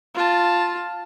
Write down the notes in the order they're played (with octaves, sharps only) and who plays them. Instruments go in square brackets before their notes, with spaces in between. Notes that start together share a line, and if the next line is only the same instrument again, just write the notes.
[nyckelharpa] F4 A5